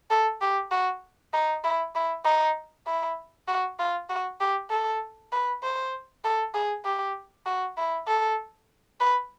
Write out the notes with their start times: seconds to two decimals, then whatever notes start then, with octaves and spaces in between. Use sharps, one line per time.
0.10 A4
0.41 G4
0.71 F#4
1.33 D#4
1.64 E4
1.95 E4
2.25 D#4
2.87 E4
3.48 F#4
3.79 F4
4.09 F#4
4.41 G4
4.70 A4
5.32 B4
5.63 C5
6.25 A4
6.54 G#4
6.85 G4
7.46 F#4
7.77 E4
8.07 A4
9.00 B4